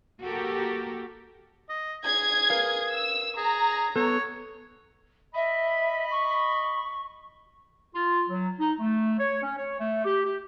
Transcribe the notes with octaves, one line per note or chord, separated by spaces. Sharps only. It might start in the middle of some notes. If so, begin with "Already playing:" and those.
A#3 F#4 G4 A4 A#4
D#5
G#4 G#6
A#4 B4 F5
E6
G#4 A#5
B3 A4 C#5
D#5 E5 B5
C#6
F4
F#3
D#4
A3
C#5
C#4
C#5
A3
G4
G4